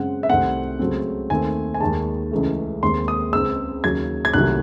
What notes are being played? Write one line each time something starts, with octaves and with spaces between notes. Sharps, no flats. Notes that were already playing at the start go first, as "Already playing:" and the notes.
Already playing: F#2 C#3 G#3 C4 F#5
E5
C2 C3 D#3 A3 C4 F#5
C#2 C#3 F#3 A3 C4
D#2 D#3 A3 C4 G#5
G#5
D#2 D#3 G#3 A5
C#2 C#3 E3 A3
D#2 D#3 G#3 C4 C6
D#6
C#2 C#3 G#3 C4 E6
D#2 C#3 F#3 G#6
G#6
C2 C3 D#3 F#3 A3 F#6